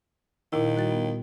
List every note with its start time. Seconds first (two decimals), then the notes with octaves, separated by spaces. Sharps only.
0.53 A#2 D#3 E4
0.75 G3 F#4 A6
0.92 B3